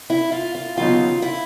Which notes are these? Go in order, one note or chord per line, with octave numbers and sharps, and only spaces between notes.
E4
F4
F4
D#2 C#3 F#3 B3 D#4 F4
E4